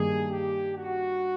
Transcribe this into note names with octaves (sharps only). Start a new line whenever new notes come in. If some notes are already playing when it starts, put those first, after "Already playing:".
Already playing: G2 D#3 G3 A#3 G#4
G4
F#4